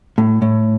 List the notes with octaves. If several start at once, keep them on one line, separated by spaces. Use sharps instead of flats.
A2
A2